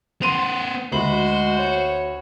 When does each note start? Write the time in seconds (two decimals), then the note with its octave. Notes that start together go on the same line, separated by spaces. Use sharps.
0.22 B3 C5 C6 D#7 F7
0.92 D2 G#3 F#4 C5 B5 F#7
1.59 C#5